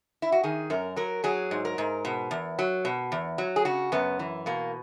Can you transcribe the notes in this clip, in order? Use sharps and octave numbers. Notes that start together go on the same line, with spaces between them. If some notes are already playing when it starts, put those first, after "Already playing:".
E4
F#4
D#3 G#4
F#2 A#4
F#3 A#4
F#3 G#4
G#2
A#4
G#2
B2
E2
F#3
B2
E2
F#3
G#4
C#3 F#4
F#2 B3
E3
B2 A#3